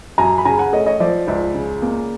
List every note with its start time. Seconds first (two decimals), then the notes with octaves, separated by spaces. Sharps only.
0.18 F#2 G#5 A#5
0.38 B5
0.45 C#3 G#5 A#5
0.59 F#5 G#5
0.73 A3 C#5 D#5
0.86 C#5 D#5
1.00 F3 D5 E5
1.28 C#2 D5 E5
1.55 C#3
1.82 A#3